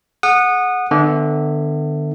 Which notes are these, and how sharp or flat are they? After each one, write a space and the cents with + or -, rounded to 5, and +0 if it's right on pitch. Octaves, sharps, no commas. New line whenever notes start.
G#4 +25 F#5 -15 D#6 -20
D3 +35 B3 +25 E5 +0